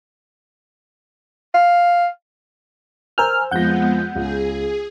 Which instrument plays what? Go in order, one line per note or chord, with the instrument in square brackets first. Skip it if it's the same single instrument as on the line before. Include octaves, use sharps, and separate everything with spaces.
[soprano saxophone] F5
[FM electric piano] A#4 G#5 F6 [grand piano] C5 E6 G6
[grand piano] F2 F3 A#6 [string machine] G#3 B3 [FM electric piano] F#5 G6
[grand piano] C#2 [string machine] G#4